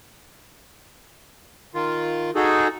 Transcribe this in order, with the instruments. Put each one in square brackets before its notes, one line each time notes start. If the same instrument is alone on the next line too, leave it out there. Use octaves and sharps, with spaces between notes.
[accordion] D#3 F4
D#4 F#4 G#4 A4